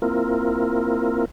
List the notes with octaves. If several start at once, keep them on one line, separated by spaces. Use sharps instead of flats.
A#3 C4 E4 F4 A#4